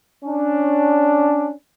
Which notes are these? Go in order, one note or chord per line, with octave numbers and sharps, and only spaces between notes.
C#4 D4